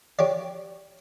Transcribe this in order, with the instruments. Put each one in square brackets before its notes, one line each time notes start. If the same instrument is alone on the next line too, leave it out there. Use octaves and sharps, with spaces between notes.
[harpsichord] G4 C#5 D5